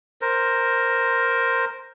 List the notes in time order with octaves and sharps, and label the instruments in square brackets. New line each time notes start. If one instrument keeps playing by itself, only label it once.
[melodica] A#4 C5